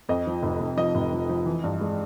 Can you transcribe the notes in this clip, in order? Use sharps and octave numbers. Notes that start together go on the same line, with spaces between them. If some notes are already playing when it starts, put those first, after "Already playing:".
F2 D#5
F3
F1
F1
F3 D#5
F1
F3
F3
E3
G2
G#3